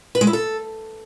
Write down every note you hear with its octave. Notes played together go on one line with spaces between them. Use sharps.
B4
G#3
E4
A4